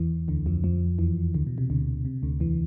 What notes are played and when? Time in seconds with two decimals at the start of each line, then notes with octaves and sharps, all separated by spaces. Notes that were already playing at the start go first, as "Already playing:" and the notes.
Already playing: E2 E3
0.28 D2 D3
0.46 F2 F3
0.64 F2 F3
0.99 E2 E3
1.34 D2 D3
1.47 B2
1.58 C3
1.70 D2 D3
2.05 C3
2.23 D2 D3
2.40 E2 E3